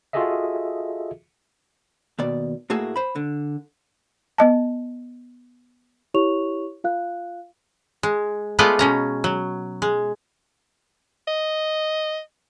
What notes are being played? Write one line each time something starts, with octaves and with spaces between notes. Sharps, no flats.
F4 F#4 G#4 A4 D#5 E5
D#2 B2 D5
A2 A3 A#3 F#4 G#4 E5
C5 B5
D3
B3 D#5 A5
E4 G4 C#5 C#6 F7
F4 F5 F#6
G#3
G#3 A3 B3 F4 D5 D#5
B2 C#4 A#5
F#3
G#3
D#5